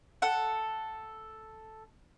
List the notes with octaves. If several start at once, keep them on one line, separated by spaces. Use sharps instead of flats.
A4 F#5